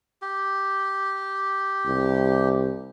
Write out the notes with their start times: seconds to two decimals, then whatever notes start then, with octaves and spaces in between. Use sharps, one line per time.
0.22 G4
1.87 C2